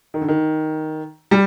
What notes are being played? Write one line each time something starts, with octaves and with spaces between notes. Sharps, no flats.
D#3
D3
D#3
G3